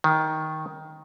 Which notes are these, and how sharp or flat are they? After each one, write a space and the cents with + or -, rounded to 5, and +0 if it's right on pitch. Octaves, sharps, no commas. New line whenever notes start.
D#3 +10